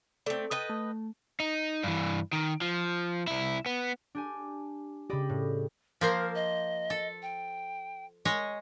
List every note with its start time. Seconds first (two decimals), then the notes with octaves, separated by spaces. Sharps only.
0.26 A3 C4 D5
0.51 A4 B4 D#5 G5
0.70 A3
1.40 D#4
1.83 G2 E3
2.33 D#3
2.61 F3
3.27 C2 E4
3.66 B3
4.15 D4 G4 G#5
5.10 C#3 G4 D5 D#5 B5
5.29 A2
6.01 F3 A#3 A#4 C5
6.35 D#5
6.90 A4
7.22 G5
8.25 G#3 C#5 D#5